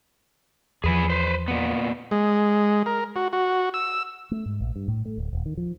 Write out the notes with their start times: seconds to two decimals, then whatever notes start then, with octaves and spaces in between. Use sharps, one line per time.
0.84 E2 F3 G#4 B4 G#5
1.10 B4 C5
1.48 A#2 B3
2.11 G#3
2.86 A#4
3.16 F#4
3.33 F#4
3.74 E6
4.31 A3
4.46 G#2
4.61 A#1
4.76 G2
4.88 A2
5.05 A3
5.18 D1
5.33 D#1
5.46 D#3
5.57 F3